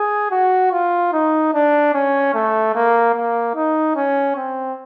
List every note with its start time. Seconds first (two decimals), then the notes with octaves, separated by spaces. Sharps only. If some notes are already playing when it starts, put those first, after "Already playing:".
Already playing: G#4
0.31 F#4
0.72 F4
1.13 D#4
1.54 D4
1.94 C#4
2.34 A3
2.75 A#3
3.15 A#3
3.55 D#4
3.95 C#4
4.36 C4